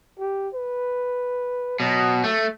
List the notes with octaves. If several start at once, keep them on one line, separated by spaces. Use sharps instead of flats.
G4
B4
B2 F#3
A3